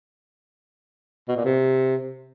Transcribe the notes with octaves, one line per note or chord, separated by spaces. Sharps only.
B2
A#2
C3